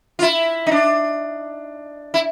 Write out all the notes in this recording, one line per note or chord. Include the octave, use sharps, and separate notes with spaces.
F4
E4
D#4
D4
E4